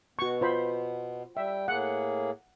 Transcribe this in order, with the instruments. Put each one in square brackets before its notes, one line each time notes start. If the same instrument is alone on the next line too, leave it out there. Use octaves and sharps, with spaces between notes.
[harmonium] B2 B3 [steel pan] F#4 C#6
[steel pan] F4 C5 B5
[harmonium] G3 G5 [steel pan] E5
[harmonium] A2 A#3 G#4 [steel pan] F#5